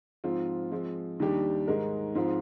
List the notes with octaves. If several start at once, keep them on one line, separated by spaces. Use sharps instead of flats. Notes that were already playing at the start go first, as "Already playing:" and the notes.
G#2 F3 C4 F4
F3 G#3 C4
D#2 D#3 G3 D4 G4
G#2 D#3 G#3 D#4 A#4
G#2 F3 C4 F4